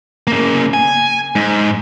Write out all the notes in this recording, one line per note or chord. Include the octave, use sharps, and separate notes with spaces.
C#3 A#3
G#5
G#2